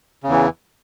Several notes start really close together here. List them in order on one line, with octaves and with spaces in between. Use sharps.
C#3 E2 E3